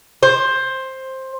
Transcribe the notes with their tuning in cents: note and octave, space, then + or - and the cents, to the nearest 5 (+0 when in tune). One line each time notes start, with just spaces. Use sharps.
C5 +10